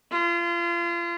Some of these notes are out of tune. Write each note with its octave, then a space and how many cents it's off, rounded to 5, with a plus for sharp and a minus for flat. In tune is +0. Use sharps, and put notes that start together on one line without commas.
F4 -30